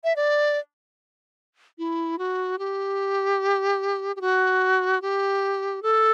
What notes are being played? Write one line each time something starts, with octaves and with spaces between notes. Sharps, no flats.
E5
D5
E4
F#4
G4
G4
F#4
G4
A4